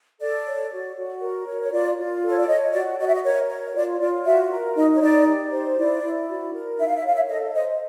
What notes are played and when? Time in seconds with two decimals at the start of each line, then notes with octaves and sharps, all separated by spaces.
0.20 A4 D5
0.46 C#5
0.72 F#4
0.97 F#4
1.21 A#4
1.47 C#5
1.61 C#5
1.72 F4 D5
1.97 F4
2.23 A4
2.29 C#5
2.39 D5
2.48 C#5 D#5
2.73 F#4 D5
2.98 F#4 D#5
3.06 E5
3.14 D#5
3.24 A#4 C#5
3.49 C#5
3.74 F4 D5
3.99 F4 D5
4.25 F#4 E5
4.50 A#4
4.76 D#4 D#5
4.95 C#5
5.01 D#4 D5
5.26 G4
5.52 C5
5.77 E4 D5
6.03 E4
6.28 F#4
6.53 A#4
6.78 D#4 E5
6.87 F5
6.96 E5
7.03 C#5 F5
7.14 E5
7.28 A4 D#5
7.54 C5 D#5